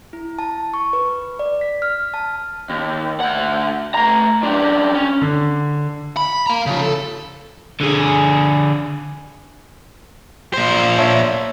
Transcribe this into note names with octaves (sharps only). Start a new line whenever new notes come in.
E4
A5
C#6
B4
D5
B6
F6
A5
D#2
D2 F#5
A3 A#5
F#2 D4
C#4
D3
B5
F5 A#5
C#3 F3
A4
D3 G#4
A#2 C5
C#5 E5 A5